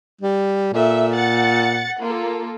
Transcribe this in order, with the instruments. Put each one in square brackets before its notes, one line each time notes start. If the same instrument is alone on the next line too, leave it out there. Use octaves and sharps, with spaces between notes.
[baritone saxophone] G3
[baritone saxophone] A#2 [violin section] A4 E5
[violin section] F#5 A6 C#7
A#3 F4 A4